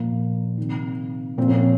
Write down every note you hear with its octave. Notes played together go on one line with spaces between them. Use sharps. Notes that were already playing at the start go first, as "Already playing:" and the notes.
Already playing: A#2 F3 A#3
C3 D#3
A#2 F3 C4
C#4
C4